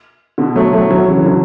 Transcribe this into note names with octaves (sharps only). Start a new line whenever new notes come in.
B2 D3
F#3 A3
F#3 A3
D3 F#3
C#3 E3
D3 F#3